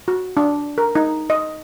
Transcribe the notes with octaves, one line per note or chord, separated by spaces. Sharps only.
F#4
D4
A#4
D#4
D#5